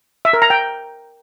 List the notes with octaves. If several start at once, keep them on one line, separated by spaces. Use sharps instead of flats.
E5
A#4
A#5
G5